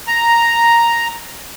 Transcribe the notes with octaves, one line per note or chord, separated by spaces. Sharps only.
A#5